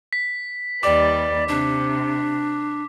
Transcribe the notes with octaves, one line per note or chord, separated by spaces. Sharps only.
B6
D#2 G3 B4 D5 D6
C3 D4